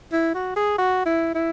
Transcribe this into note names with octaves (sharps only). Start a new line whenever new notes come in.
E4
F#4
G#4
F#4
E4
E4